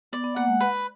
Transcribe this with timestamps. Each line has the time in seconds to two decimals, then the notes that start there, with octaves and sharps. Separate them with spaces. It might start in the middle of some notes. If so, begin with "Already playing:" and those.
0.13 B3 D5
0.24 B3
0.36 A#3 F#5
0.48 G#3
0.60 B4